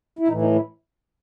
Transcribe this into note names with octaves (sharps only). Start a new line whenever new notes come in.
E4
A2 E3 D#4
D#4
E4